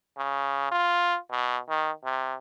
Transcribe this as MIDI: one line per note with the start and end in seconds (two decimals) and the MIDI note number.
0.18 0.68 49
0.72 1.18 65
1.31 1.59 47
1.69 1.91 51
2.05 2.35 48